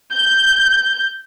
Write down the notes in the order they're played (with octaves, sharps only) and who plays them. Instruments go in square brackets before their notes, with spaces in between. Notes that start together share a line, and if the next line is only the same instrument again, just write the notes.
[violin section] G6